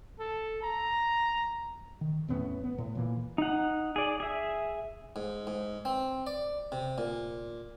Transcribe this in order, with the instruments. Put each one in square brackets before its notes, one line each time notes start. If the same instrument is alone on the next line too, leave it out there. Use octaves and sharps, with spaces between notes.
[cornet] A4
A#5
[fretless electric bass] D#3
E2 A2 B3 C#4
B3
A2
A#2 E3 A#3
[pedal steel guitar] D#4 F#5
G#4 D5
G#4 E5
[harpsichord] G#2
G#2
C4
D5
C3
A#2